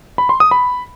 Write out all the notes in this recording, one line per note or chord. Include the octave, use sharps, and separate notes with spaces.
B5
C6
D#6
B5